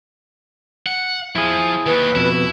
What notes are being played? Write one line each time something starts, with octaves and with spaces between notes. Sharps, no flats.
F#5
F3 E4 G#4
D#2 B4
F2 B2 E4